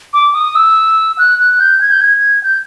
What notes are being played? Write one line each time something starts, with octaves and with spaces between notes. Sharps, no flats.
D6
D#6
E6
F#6
F#6
G6
G#6
G6
G#6
G6